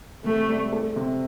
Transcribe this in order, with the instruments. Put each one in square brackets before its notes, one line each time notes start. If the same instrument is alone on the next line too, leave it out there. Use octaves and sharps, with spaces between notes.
[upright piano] C3 [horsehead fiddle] A3
[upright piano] G3
A3
C3